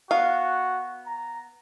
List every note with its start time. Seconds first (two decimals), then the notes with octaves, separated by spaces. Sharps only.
0.11 B3 F#4 F5
1.07 A#5